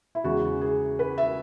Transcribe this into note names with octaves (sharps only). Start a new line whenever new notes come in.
E4
E2 C#3 G#3 F#4
G#4
B4
E5